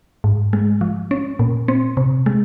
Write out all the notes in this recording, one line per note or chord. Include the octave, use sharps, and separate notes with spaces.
G#2
G#3
F3
C#4
A#2
C4
C3
G#3